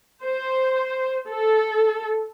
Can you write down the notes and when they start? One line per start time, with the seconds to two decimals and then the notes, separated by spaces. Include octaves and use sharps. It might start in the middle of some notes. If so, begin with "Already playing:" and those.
0.23 C5
1.27 A4